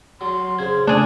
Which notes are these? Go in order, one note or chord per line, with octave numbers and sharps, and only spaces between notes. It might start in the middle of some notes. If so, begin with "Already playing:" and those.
F#3 C6
C#3 C5 G#6
C#3 A3 C#4 D4 G#4 D5